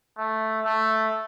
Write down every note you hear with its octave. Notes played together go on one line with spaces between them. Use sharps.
A3
A3